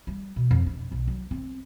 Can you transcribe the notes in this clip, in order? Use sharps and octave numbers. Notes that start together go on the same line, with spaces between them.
G3
B2
F2
D4
B1
F#3
C4